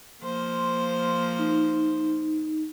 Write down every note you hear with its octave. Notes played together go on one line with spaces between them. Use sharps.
F3 A#3 C5 C6
D#4